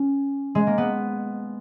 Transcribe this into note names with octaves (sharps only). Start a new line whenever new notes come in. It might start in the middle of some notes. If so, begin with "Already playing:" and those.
Already playing: C#4
G#3
A#3
B3